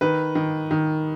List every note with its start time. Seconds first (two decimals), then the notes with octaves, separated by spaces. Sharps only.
0.01 D#3 B4
0.35 D#3
0.71 D#3